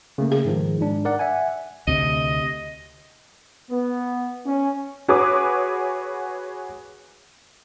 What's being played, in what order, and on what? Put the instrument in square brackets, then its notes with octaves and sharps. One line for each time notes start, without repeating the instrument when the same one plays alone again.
[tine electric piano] C#3 A3 A#3
[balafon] G#4
[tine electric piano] G#2 D#3 F3
G#2 D4
A#4 D5 F#5
E5 F#5 G#5
[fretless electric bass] D2 C3 [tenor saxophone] D#5
[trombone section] B3
C#4
[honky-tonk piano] F#4 G#4 B4 C#5 D6 D#6